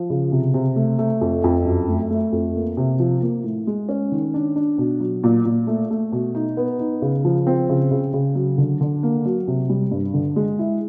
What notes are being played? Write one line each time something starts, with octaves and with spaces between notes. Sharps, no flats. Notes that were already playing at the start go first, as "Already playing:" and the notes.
Already playing: F3
C#3
C3
C3
A3
A3
F2
F2
F#2
A3
A3
F2
A#3
C3
F3
A#3
A2
G#3
C#4
D#3
D4
D4
B2
F#3
A#2
A#2
A3
A3
B2
D#4
B3
D#4
C#3
F3
C4
C#3
C#3
C#3
F#3
D3
D3
A#3
F#3
C3
G3
G2
D3
G#3
E4